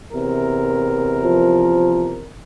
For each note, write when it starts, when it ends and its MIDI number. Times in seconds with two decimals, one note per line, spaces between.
0.13 2.31 40
0.13 2.31 48
0.13 2.31 70
1.24 2.16 53